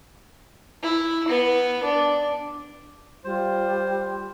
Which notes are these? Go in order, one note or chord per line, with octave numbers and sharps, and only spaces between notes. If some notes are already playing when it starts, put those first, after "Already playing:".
E4
B3 B4
D4
G3 F4 C5